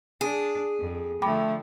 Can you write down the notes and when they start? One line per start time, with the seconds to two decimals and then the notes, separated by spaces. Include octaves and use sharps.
0.21 D4 G#4
0.79 F2
1.22 D3 F3 A3 G5 B5 D6